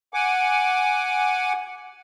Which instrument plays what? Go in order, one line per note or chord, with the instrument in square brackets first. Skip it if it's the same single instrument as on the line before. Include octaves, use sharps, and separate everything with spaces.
[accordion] F#5 G#5 D6